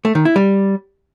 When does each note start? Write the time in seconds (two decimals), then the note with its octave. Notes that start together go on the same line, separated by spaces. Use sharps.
0.05 A3
0.15 D#3
0.25 E4
0.36 G3